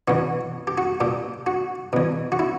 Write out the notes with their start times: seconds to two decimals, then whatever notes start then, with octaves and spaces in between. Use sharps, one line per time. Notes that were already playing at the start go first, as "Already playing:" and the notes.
0.08 E2 B2 F#4
0.67 G4
0.78 F#4
1.00 A#2 G4
1.46 F#4
1.93 E2 B2
2.32 F#4
2.39 E4